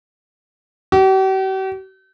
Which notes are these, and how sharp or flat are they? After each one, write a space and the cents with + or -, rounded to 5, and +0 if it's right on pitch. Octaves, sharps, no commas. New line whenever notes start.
G4 -45